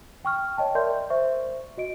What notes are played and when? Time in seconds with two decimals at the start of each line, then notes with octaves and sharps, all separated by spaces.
0.25 G5 C#6 F6
0.58 C#5 D#5 G5 A5
0.75 A#4 D5 E5 C6 G6
1.10 C5 E5 C#6
1.77 F#4 D#5 D7